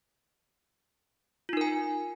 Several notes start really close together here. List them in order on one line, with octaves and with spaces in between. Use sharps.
F4 D#4 A#4 G#5